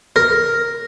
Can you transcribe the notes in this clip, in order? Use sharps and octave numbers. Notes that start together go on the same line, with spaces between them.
A#4